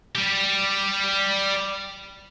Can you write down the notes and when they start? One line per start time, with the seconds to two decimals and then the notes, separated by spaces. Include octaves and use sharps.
0.15 G3 G4